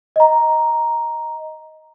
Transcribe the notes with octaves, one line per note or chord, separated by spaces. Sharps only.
D#5 A#5